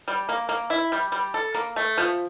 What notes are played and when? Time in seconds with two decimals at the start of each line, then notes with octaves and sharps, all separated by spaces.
0.08 G3
0.29 A#3
0.49 A#3
0.70 E4
0.92 G3
1.12 G3
1.34 A4
1.55 A#3
1.76 A3
1.97 F3